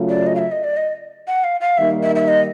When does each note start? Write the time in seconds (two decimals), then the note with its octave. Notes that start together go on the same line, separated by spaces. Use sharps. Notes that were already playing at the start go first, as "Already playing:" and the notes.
Already playing: C#3 F#3 A3 C#4 F4
0.09 D5
0.26 D#5
0.35 F5
0.39 E5
0.52 D#5
0.64 D5
0.77 D#5
1.27 F#5
1.44 F5
1.61 F5
1.77 D#3 G3 A#3 D#4 E5
2.03 E5
2.15 E5
2.28 D#5